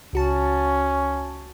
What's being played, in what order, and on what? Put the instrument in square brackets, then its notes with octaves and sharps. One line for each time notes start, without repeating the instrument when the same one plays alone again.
[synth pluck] C#2 F#4 A5 [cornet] C#4